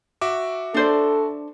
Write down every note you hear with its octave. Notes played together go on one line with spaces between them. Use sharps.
F#4 E5 D6
D4 A4 C5 D5